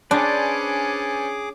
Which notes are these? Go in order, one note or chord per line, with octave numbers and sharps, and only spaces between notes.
C#4 D4 G#4 B4 C5 D5 D6